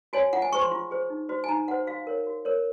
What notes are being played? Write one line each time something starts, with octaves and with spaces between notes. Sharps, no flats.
F#4 C#5 G#5
F4 F#5
G#5
G#4 C5 C#6
C6
F4
G#4 C5
D#4
F#4 C5
G#5
D#4 A#5
F#4 C5 F#5
F#4 F5
A#4 C#5
F#4
A#4 C#5